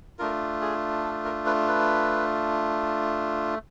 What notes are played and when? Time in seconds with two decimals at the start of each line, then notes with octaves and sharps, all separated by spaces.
0.19 A3 D4 F4 A#4
0.61 G#4
1.04 A4
1.25 A#4
1.46 B4
1.68 B4